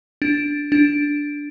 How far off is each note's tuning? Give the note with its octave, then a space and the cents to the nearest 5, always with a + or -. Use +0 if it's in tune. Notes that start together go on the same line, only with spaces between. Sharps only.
D4 -5
D4 -5